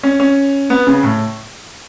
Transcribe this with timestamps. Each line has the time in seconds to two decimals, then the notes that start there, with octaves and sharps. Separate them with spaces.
0.03 C#4
0.20 C#4
0.70 B3
0.87 C#3
1.03 A2